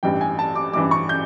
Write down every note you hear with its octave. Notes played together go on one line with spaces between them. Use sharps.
A1 G2 E3 G5
G#5
A5
D6
A1 G2 E3 D6
C#6
G6